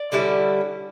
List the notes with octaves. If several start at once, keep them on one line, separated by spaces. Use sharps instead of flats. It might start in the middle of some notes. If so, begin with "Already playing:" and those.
Already playing: D5
D3 G3 C#4 E4